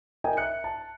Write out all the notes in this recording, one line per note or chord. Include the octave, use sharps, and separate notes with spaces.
A#4 D#5 G5 G#5 A#5
E5 F#6 C#7
A5